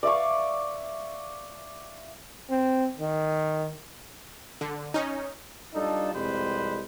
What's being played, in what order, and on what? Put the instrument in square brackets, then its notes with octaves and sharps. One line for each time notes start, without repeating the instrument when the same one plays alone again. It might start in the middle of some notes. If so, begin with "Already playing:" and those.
[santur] D5 E5 F5 C#6
[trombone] C4
D#3
[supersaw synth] D3
C#4 D#4
[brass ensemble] G3 D4 D#4 F4 A4
C2 F2 G3 G#3 B4 C5